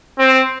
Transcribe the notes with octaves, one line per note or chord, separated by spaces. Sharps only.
C4